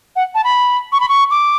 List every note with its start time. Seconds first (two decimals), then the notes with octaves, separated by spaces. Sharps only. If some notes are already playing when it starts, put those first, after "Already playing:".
0.16 F#5
0.35 A5
0.44 B5
0.92 C#6
1.00 B5
1.09 C#6
1.31 D6